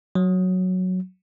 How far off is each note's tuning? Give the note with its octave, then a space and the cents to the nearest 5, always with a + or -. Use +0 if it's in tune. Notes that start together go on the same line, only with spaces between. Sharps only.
F#3 -5